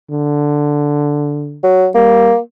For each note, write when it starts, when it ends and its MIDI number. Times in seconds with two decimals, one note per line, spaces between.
0.10 1.62 50
1.63 1.87 54
1.95 2.32 55
1.95 2.38 58